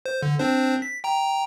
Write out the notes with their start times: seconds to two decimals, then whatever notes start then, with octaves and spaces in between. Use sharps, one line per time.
0.06 C5
0.22 D3
0.39 C4 D4 C5
0.82 B6
1.04 G5 A#5